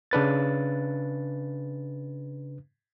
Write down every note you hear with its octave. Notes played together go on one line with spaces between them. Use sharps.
C#3 D4 B4 A6